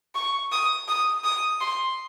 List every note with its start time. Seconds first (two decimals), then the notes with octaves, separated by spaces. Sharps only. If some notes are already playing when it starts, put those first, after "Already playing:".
0.15 C#6
0.52 D#6
0.88 D#6
1.24 D#6
1.60 C6